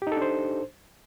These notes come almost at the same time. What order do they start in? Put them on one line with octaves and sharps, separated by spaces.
G4 D#4 A4 D4 C5